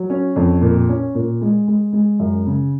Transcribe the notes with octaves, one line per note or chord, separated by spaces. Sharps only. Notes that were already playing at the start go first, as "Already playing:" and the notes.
Already playing: F#3
C#4
F2
A#2
C#4
A#2
G#3
G#3
G#3
F#2
C#3